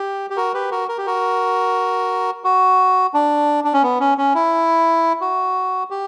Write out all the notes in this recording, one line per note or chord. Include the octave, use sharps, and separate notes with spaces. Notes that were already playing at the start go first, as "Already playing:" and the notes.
Already playing: G4
G4
F#4 A#4
G4 B4
F#4 A#4
A#4
G4
F#4 A#4
F#4
D4
D4
C#4
B3
C#4
C#4
E4
F#4
G4